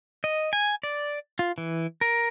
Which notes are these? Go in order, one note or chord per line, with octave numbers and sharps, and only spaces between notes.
D#5
G#5
D5
F4
E3
A#4